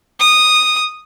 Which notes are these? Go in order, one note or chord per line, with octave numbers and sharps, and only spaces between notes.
D#6